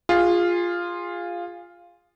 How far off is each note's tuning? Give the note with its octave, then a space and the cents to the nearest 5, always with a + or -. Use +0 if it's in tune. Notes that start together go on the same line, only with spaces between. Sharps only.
F4 +0 G#4 -25